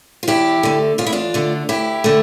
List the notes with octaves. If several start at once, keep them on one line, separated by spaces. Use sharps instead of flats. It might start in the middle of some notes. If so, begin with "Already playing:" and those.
F4
E2 E4 G4
D3 A3
E2 F4
E4
D4 F4
D3 A3
D2 E4 G4
D3 A3